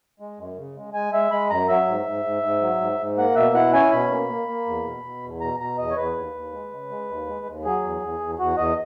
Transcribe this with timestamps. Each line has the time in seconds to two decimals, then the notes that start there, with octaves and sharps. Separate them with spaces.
0.20 G#3
0.39 F#2
0.57 C#3
0.76 G#3
0.94 G#3 G#5
1.13 G#3 E5
1.31 G#3 B5
1.50 F#2 A#5
1.68 F#3 E5
1.88 G#2
2.06 G#2
2.25 G#2
2.43 G#2
2.61 F#3
2.81 G#2
2.99 G#2
3.17 A#3 F#5
3.36 B2 E5
3.54 E4 F#5
3.74 C#4 G#5
3.92 B2 B5
4.10 A#3
4.29 A#3
4.48 A#3
4.66 E2
4.85 B2
5.04 B2
5.23 E2
5.41 B2 A#5
5.60 B2 A#5
5.78 E2 D#5
5.91 C#5
5.97 E2 B4
6.16 D#2
6.34 D#2
6.52 G#3
6.71 C#3
6.90 G#3
7.09 D#2
7.27 G#3
7.46 D#2
7.64 F#3 G#4
7.83 E2
8.02 E2
8.20 E2
8.39 E2 F#4
8.57 E2 D#5